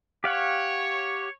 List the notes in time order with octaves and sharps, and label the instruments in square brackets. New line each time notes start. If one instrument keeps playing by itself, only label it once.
[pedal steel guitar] G4 F5 F#5 [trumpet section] C#5